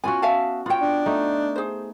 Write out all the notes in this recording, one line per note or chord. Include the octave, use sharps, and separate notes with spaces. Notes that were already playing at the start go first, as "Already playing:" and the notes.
B3 C#4 F4 F#4 G#5
E5 F5 A5
B3 F4 C#5 G5
D4
A3 D#4
G#4 C5